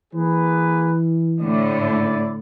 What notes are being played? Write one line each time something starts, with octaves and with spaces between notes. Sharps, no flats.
E3 A#3 G#4 B4
A2 D3 E4 D5